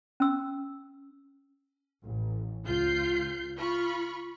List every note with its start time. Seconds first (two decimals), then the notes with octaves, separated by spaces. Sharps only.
0.20 C#4 E6
2.03 A1
2.65 C#2 F4 G6 C7
3.58 F4 B5 C#6